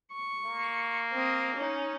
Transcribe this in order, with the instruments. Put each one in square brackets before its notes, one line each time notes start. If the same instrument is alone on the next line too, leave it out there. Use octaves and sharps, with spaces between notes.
[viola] C#6
[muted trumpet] A#3
[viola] C4 D#5
C#4 D#4